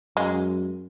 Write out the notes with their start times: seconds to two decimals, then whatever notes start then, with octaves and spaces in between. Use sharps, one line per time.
0.17 F#2 G#3